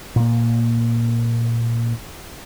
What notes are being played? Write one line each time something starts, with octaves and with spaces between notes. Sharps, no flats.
A#2 A#3